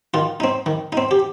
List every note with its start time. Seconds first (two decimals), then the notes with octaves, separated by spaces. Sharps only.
0.14 D#3 F4
0.40 C4 D#4
0.66 D#3
0.93 C4 D#4
1.11 G4